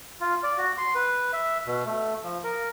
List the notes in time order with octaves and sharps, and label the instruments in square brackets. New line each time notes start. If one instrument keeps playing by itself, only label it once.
[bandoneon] F4
D5
F#4
C6
B4
E5
B2
A3
F3
A#4